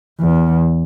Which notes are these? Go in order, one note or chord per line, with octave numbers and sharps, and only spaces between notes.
E2